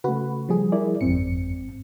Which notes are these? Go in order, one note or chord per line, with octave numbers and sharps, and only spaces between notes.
C#3 A3 F#4 B4
F3 G3 G#4
E4 A#4 D5
G1 F2 G#2 C4 C#7